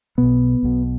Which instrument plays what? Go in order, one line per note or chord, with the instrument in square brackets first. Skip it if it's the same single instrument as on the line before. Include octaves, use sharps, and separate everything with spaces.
[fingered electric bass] B1 B2 B3
B1 B2